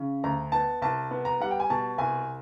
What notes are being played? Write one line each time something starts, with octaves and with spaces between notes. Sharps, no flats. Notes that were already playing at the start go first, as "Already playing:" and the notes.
Already playing: C#3
D2 A#5
B3 A5
C2 A5
B3
A#5
G3 F#5
G5
G#5
B2 A5
C2 G#5